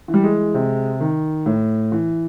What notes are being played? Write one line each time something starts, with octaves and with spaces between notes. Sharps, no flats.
E3
G3
G#3
C3
D#3
A2
E3